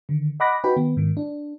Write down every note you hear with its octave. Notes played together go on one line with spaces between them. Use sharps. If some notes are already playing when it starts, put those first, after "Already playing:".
D3 D#3
D#5 F#5 B5 D6 F#6 A#6
D#4 F#4 B4 G5 B5
D#3 B3
G#2 D#3
D4